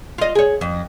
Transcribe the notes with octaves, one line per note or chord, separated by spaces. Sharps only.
F4 D#5
G#4 C#5
F2